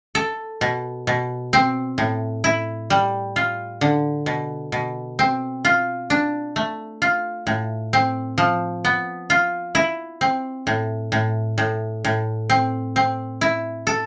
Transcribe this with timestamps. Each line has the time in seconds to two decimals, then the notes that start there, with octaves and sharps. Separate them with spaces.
0.15 A4
0.61 B2
1.07 B2
1.53 C4
1.98 A2
2.44 E4
2.90 G3
3.36 F4
3.81 D3
4.26 B2
4.72 B2
5.19 C4
5.65 F4
6.10 D4
6.56 A3
7.02 F4
7.47 A2
7.93 C4
8.38 F3
8.85 B3
9.30 F4
9.75 E4
10.21 C4
10.67 A2
11.12 A2
11.58 A2
12.05 A2
12.50 C4
12.96 C4
13.41 E4
13.87 A4